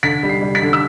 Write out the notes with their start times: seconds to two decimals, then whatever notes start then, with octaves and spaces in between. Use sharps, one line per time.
0.03 D3 B6
0.23 G3
0.29 C7
0.42 G3
0.55 B6
0.62 D3
0.73 E6